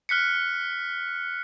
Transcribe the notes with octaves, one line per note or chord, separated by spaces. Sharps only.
F6 F#6 B6 C#7